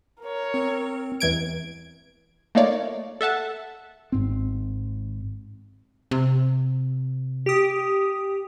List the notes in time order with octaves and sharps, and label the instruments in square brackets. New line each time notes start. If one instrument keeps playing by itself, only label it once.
[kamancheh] A#4 C#5
[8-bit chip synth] C4
[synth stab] E2 E3 G#6 D7
A3 A#3 D#4 F4 C#5 D5
A4 E5 F#5 A5
[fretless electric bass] G#1 G#2 C4
[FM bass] C3
[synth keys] G4 D#6